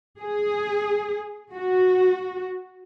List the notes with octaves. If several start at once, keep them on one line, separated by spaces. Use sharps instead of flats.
G#4
F#4